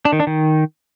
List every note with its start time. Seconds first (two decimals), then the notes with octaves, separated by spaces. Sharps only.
0.05 D4
0.12 D#3
0.20 D4
0.27 D#3